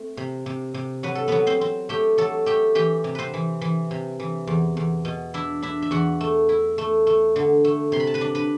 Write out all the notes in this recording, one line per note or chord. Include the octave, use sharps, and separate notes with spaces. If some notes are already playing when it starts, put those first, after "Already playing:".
Already playing: A3 C4
C3
C3
C3
F#3 B4
A4
F#3 B3 B4
C4 C5
C4
A3 G4 G5
F#3 A4 A5
A3 G4 G5
E3 G4 G5
C3
C4 B4 C5
E3
E3
C3
E3
E2
E2
B2
D4 E4 E5
D4 E4 E5
E5
E2 F#4 F#5
A3
E4
A3
A3
D3
A3
C3 C6
B5
A5
B4 B5
D4
B4 B5